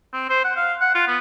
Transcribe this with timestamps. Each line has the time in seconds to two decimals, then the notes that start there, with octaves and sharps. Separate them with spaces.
0.13 C4
0.29 C5
0.44 F#5
0.56 F5
0.81 F#5
0.95 F4
1.07 B3